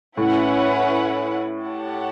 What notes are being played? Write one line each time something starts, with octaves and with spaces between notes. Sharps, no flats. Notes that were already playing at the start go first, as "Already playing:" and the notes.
A2 C#4 E4 B4 F#5
G4 C#5 F#5 A5